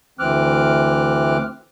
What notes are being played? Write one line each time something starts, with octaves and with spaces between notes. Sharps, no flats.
D2 E3 C4 D6 F6 F#6